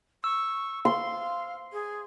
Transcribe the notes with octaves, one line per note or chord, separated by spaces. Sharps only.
C#6 E6
F5 C6
G#4